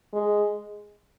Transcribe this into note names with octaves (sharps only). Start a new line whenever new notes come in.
G#3